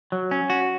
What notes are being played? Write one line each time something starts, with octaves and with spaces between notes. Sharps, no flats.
F#3
C#4
F#4